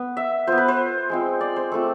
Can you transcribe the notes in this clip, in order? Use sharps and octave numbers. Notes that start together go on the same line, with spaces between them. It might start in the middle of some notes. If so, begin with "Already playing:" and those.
Already playing: B3
E5
B3 F4 C5
B4
C5
G#3 C4 F4
D5
C5
A3 C4 F4 A4